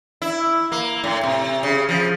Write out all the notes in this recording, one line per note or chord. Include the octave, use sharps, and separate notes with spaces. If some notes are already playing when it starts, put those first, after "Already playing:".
E4
A#3
A2
C3
C#3
F3